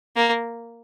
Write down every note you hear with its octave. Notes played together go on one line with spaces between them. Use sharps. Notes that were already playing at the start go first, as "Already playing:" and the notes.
A#3